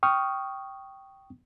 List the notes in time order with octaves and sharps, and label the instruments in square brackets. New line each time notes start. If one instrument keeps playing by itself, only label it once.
[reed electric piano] G5 C#6 D#6 F6